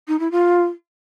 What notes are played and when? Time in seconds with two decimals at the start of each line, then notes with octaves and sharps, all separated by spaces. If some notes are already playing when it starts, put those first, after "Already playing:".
0.08 D#4
0.20 E4
0.31 F4